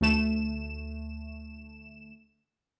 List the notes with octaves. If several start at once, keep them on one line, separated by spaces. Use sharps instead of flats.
D2 A3 E7